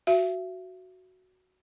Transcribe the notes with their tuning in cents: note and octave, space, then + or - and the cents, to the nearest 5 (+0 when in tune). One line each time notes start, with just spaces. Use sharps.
F#4 +0 E5 +35